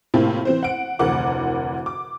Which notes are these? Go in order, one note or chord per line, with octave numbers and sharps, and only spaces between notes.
A2 C3 A#3 C4 E4 F4
E3 C4 C5
F#5 D7
F1 D2 E3 A#4 F#5 D6
D6